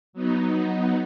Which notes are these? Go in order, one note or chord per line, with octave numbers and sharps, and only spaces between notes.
F#3 B3 D#4